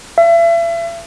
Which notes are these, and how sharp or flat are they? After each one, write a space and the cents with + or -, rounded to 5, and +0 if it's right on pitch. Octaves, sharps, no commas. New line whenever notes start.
E5 +40